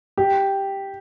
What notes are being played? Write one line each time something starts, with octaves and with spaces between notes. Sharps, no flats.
G4